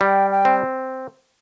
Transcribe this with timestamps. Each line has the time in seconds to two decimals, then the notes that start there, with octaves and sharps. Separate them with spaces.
0.01 G3 G5
0.31 G5
0.45 C4